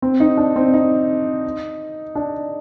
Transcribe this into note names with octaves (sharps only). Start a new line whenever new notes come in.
C4
D#4
D4
C4
D#4
D4